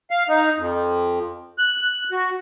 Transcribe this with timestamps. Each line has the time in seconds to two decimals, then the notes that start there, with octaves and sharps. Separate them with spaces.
0.11 F5
0.29 D#4
0.57 F2
1.58 F#6
1.81 F#6
2.11 F#4